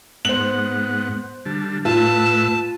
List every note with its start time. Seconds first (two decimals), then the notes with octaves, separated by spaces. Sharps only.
0.25 G#2 B3 C5 F#5 F#7
1.46 D3 G3 A5
1.85 A2 F4 B4 A5 E6